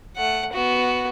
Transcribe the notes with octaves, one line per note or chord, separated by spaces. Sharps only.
A3 F#5
B3 F#4